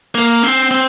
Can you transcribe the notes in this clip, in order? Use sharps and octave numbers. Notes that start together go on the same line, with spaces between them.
A#3
C4
C4